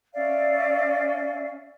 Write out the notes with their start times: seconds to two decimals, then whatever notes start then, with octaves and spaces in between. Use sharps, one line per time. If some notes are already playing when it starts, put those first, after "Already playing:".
0.14 C#4 D5 E5 F5